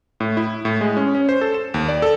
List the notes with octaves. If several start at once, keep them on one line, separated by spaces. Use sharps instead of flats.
A2
E4
A2
G#3
C#4
C#4
C5
A4
E7
D#2
D5
A4